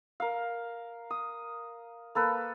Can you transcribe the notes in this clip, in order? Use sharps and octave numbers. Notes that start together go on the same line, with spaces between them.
A#4 F5
D#6
A#3 A4 B4